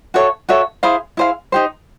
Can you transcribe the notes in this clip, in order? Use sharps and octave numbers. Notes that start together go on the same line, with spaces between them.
F#4 A4 C#5 E5
F#4 A4 C#5 E5
E4 G#4 C5 F5
E4 G#4 C5 F5
D#4 G4 C5